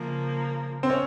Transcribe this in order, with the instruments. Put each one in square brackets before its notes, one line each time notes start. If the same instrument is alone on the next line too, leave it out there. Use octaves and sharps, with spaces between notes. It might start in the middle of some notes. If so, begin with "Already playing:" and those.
Already playing: [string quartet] C#3 F3 A#3
[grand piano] C4
C#4